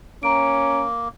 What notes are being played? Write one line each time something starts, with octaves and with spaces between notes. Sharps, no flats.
A#3 C#4 A#5 D7